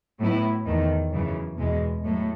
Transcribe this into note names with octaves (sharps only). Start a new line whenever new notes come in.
A2 F#3 B3 E4
E2 D#3 A3
F#2 C#3 E3
E2 B2 G#3
A2 F#3 A3